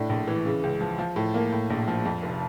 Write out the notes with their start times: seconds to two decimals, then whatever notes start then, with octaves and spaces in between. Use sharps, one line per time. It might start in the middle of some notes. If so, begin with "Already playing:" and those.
Already playing: A2 D4
0.09 A#1
0.28 E3
0.45 C#3
0.63 C#2
0.81 F3
0.99 F3
1.16 A2
1.34 A#3
1.52 A2
1.70 A#1
1.88 F3
2.05 F2
2.22 F1